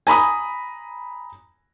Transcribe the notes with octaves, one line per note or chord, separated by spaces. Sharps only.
G#5 A#5 B5 D#6